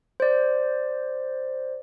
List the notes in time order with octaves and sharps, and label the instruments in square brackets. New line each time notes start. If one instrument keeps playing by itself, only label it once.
[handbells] C5 D5